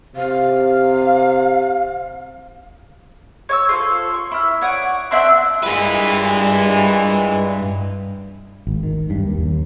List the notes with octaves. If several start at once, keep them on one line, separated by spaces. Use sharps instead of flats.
C3 F5
C#5 C#6 E6
F4 A4 C5
C#6
E4 F6
C#5 D5 F#5 D#6
C4 D4 E5 F#5
G2 A#2 E3 G#3 B4
G#1
D#3
G2
D#2
D#2